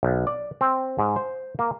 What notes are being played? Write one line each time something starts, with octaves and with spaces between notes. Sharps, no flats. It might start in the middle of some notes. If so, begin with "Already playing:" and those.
B1
D5
C4
G#2
C5
A#3